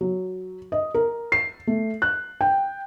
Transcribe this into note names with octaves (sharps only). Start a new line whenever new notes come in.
F#3
D#5
A#4
C7
A3
F#6
G5